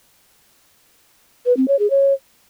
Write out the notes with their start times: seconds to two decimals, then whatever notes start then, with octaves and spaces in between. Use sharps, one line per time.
1.46 B4
1.57 C4
1.68 C#5
1.79 G#4
1.90 C#5